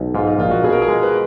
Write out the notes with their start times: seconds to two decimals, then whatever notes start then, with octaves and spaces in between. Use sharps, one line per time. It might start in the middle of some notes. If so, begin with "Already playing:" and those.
Already playing: B1
0.15 G#2 F4
0.27 D#4
0.39 A#1 F4
0.51 F#4
0.64 B2 G#4
0.72 A#4
0.82 G#4
0.88 G#3
1.03 B4